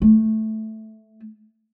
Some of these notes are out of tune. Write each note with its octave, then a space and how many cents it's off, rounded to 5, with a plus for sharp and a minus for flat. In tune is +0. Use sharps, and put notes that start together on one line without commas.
A3 -5